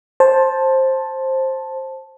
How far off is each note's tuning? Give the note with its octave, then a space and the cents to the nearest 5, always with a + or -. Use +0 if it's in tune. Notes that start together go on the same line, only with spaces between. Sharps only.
C5 +15 A5 +0